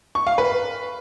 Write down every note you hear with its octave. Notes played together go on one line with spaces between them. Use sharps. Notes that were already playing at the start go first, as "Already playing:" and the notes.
C#6
F5
B4